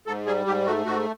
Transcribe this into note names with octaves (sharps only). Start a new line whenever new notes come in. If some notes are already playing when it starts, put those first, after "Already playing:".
G#2 A4
G3 G#4
G#2 G4
A3 F#4
G#2 F#4